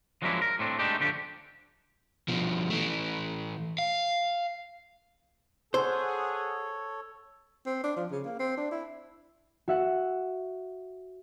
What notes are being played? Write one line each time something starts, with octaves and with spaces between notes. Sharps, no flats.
F3 F#3 G#3 A#3 D4 E4
A#4
A2 C4 D4
G#3 A3 D4 D#4 G4
D3 F3 D4 G4
B2 F3
E3 A3
F5
G#4 A4 C5 C#5 F#5
C4
D4
F3
C#3
A#3
C4
D4
E4
F#4 E5 F#5